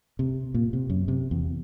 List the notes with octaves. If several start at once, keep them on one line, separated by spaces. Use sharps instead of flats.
C3
A#2
C3
F#2
C3
E2